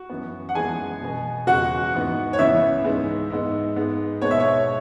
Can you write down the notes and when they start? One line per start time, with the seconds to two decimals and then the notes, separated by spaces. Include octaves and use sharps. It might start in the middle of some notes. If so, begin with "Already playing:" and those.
Already playing: F#4
0.10 F#2 E3 B3
0.49 F#5
0.55 F#2 E3 G#3 B3 G#4 G#5
1.01 B2 B3
1.47 E2 C#3 G#3 F#4 F#5
1.93 G#2 E3 B3
2.33 C#5
2.39 C#2 C#3 E3 B3 E4 E5
2.84 G#2 G#3 B3
3.30 G#2 G#3 B3
3.76 G#2 G#3 B3
4.22 B2 G#3 B3 C#5
4.31 E5
4.40 C#5